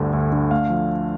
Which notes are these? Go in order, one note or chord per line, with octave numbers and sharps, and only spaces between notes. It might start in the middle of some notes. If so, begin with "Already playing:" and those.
Already playing: D2 G2 D3
D2
D3
A3 F5
F3